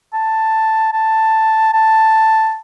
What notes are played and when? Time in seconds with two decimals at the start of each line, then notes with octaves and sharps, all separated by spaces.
0.13 A5
0.93 A5
1.73 A5